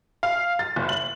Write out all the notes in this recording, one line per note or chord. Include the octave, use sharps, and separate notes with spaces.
F5
A6
F#1
F#7